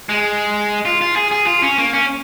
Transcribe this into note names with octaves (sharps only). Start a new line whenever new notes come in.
G#3
F4
F4
G#4
G#4
F4
C#4
A#3
C#4